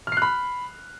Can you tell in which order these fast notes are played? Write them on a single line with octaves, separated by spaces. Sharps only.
F6 C7 F#6 B5